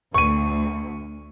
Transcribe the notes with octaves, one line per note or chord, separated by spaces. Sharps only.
D2 C#6 D#7